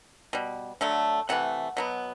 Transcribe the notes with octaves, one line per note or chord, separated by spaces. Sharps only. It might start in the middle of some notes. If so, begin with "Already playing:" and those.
B2 G3
D3 F#3 A3
C3 E3 A3 F#5
B2 F#3 B3